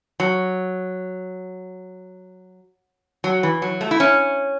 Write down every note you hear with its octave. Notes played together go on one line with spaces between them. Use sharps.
F#3
F#3
E3
F#3
A3
E4
C#4